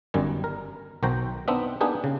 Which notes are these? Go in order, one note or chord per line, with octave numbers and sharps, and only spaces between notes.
G1 F#2 D#3 G3 G#5
A#4
B1 D#3 F#4 C5 G5 A#5
B3 C4 D4 D#4 E5
A#3 B3 D4 D#4 G4 G#4
C#3